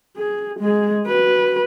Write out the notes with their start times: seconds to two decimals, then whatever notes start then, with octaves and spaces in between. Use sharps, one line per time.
0.17 G#4
0.59 G#3 G#4
1.07 F#4 B4